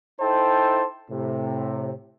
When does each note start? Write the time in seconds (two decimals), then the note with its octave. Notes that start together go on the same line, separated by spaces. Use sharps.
0.20 D#4 E4 A4 C5 G5 A5
1.11 A2 C3